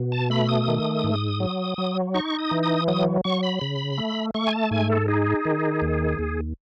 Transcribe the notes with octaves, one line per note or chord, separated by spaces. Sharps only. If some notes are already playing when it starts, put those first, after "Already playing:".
Already playing: B2
A5
A3 B5
D#6
D#3
G#2
F#3
F#3
D#4 C#6
D#6
E3
D#6
F#3 D#6
F#3 C#6
B5
C#3
A3
A3 C#6
G#5
A5
G#2 G#5
A4
D#4 G#4
D#3
D#2
D#2